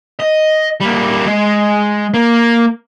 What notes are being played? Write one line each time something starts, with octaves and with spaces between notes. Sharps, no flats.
D#5
G3 A#3
G#3
A#3